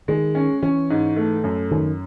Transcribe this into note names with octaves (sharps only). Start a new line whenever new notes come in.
D#3 G#3
C#4
E3 C#4
G#2
A3
F#2
F#2 D#3